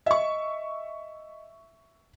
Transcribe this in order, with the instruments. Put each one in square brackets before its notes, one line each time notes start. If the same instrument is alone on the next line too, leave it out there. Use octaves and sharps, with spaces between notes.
[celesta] D#5 [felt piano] E5 C#6